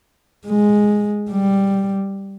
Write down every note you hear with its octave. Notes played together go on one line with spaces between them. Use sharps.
G#3
G3